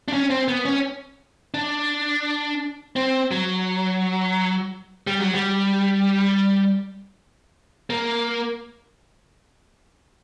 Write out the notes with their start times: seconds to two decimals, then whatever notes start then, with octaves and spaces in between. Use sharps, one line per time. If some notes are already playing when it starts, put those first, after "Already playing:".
0.08 D4
0.13 C#4
0.30 C4
0.48 B3
0.65 C#4
1.54 D4
2.96 C4
3.31 F#3
5.07 G3
5.20 F#3
5.35 G3
7.90 A#3